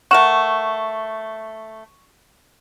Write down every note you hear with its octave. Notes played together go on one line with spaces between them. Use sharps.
A3 A#4 F#5 C#6 E7